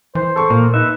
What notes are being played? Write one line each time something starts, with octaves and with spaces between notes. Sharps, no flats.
E3 C5
A4 C#6
A#2 A#3
D#4 B4 E5